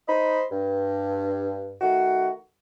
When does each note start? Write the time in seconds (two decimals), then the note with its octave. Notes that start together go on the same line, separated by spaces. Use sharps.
0.08 D#4 C5 D#5 B5
0.51 G2
1.81 D#3 A3 F#4